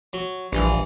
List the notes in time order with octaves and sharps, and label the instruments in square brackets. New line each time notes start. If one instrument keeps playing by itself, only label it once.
[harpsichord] F#3
[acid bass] A#1 [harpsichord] G2 E3